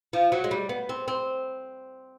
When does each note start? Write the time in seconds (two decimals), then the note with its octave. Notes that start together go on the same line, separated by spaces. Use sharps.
0.13 F3
0.32 F#3
0.44 G#3
0.51 G3
0.69 B3
0.89 C4
1.08 C4